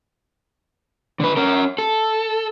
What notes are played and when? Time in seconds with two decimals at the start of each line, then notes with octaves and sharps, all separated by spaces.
1.20 D3 B4
1.37 C#4 A#4
1.78 A4